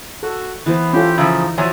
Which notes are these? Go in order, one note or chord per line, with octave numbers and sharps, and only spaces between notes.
F#4 A4
E3 B3 C5
C#4 F4 G4 A4
C#3 F3 D#4 E5
F3 F#4 C#5 E5 G#5 A#5